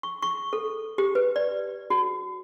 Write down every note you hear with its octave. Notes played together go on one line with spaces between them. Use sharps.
C#6
C#6
A4
G4
B4
D5
F#4